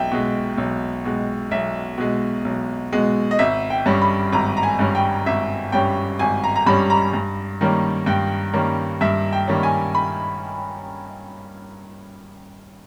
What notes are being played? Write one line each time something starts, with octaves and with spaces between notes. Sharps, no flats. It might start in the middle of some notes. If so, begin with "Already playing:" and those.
Already playing: B1 E5 G5
B2 G#3
B1
B2 G#3
B1 E5
B2 G#3
B1
B2 G#3
D#5
G#1 E5
G5
G2 G3 C#4
B5
G#1 A#5
A#5
G#5
G2 G3 C#4
G5
G#1 E5
G2 G3 C#4 G5
G#1 G#5
A#5
A#5
G2 G3 C#4 B5
A#5
G2
D#3 G3 A#3 C#4
G2 G5
D#3 G3 A#3 C#4
G2 E5
G5
D#3 G3 A#3 C#4
G#5
B5